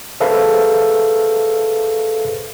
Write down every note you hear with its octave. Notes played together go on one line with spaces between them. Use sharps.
G#4 A4 B4 C5 E5 F5